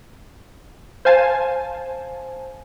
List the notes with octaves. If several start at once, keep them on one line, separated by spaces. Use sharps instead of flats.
C5 F5 G#5 A5